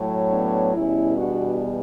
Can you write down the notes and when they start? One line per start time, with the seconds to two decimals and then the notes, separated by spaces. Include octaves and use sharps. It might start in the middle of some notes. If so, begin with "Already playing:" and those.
Already playing: A2 F#3
0.30 B3 D4
0.74 E2 B2 G3 C#4 E4
1.17 D4 F#4